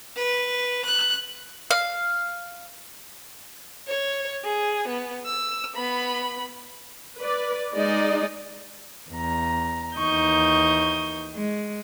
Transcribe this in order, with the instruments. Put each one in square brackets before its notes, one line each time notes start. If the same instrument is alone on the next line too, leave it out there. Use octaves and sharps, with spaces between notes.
[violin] B4
F#6
[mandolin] F5
[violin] C#5
G#4
B3
E6
B3 B5
[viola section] B4 D5
G#3 D#4 G#4 D5 D#5
[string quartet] E2 A#5
D#2 E3 D#4 C#6 D#6 G6
G#3